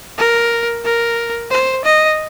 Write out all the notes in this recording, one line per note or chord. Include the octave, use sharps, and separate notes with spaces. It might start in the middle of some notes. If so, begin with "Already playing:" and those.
A#4
A#4
C5
D#5